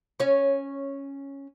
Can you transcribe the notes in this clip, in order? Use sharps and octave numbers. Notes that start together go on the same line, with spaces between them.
C#4 C#5